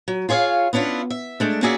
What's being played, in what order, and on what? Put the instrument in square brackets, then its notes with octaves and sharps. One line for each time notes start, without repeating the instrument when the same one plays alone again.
[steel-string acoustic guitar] F#3
F4 G#4 C#5 D#5 F5
B3 C#4 D4 E4 F4
E5
G#3 A3 D4
A#3 C#4 F#4 G#4 D5 E5